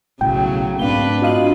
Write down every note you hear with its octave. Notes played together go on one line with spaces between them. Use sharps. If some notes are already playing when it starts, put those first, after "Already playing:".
B1 A2 C#3 F#3 G5
G#2 A3 A#3 C4 D4 B4 F5 G7
D4 F4 F#4 D#5 F5 D#7 F#7